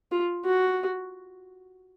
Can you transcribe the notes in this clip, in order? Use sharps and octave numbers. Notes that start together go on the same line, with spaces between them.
F4
F#4